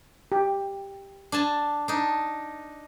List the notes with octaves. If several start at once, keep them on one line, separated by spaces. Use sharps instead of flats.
G4
D4 G#5 A5
D4 D#4